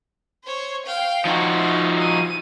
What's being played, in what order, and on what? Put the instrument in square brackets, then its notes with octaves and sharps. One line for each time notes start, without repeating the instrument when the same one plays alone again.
[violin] C5 C#5
F5 G5
[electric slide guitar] F3 D#4 F#4 [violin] E4
[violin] D#7